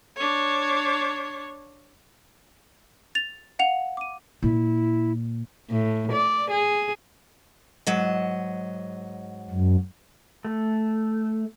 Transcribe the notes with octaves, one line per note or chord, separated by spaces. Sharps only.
D4 C#5
A6 F7
F5 F#5 F7
D6 D#7
A#2 E4
A2
D5
G#4
G#2 F#3 D#5
F#2
A3